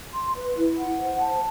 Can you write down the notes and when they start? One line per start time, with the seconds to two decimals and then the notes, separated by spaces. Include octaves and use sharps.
0.14 C6
0.35 B4
0.56 E4
0.78 F#5
0.99 C5
1.20 A5